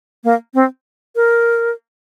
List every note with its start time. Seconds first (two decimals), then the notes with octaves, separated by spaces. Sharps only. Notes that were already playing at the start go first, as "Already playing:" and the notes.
0.24 A#3
0.54 C4
1.16 A#4